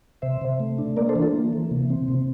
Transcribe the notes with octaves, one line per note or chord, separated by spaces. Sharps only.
C3 C5 E5
C3
A3
D4
A#3 A#4 D5
A4 C5
E3
F4 A4
A#3
E3
C3
C4
C3